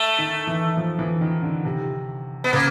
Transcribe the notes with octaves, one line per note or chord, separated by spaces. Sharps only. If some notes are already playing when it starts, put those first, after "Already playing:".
Already playing: A3
D#3
E3
F3
E3
D#3
D3
C3
B3
C#3 A#3